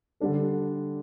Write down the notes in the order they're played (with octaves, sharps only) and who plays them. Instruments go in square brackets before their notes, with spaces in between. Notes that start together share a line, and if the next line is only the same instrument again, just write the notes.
[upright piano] D3 G3 D4 A4